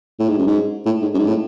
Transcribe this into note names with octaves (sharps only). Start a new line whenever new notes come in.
A2
G#2
F#2
G#2
A2
G#2
F#2
G#2
A2